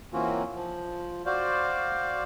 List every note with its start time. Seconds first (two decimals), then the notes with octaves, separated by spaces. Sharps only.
0.13 E3 A#3 C4 C#4 F4 F#4
0.55 F3
1.26 F#4 C5 D5 F5